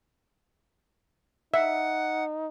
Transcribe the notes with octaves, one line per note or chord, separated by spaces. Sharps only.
D#4 E5 F#5